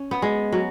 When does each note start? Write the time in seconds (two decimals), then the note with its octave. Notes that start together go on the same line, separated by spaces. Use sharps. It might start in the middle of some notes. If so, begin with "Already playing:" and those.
Already playing: C#4
0.11 B3
0.22 G#3
0.52 F#3